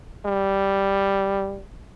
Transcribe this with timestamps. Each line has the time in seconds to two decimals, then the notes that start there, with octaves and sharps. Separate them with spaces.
0.26 G3